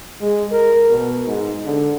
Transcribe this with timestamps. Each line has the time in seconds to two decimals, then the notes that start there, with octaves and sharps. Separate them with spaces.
0.21 G#3
0.52 A#4
0.90 B2
1.26 G#2
1.65 D3